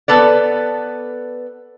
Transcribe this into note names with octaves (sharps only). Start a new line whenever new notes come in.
B3 A4 B4 D5